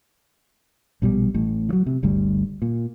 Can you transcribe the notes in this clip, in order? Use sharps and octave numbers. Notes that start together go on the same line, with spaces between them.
A#1 B2 F3 G3
A1 A2
E3 F#3
C3
G1 D2 G3
A#2